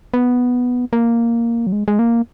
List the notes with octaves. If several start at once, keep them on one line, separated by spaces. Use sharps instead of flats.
B3
A#3
F#3
G#3
G#3
A#3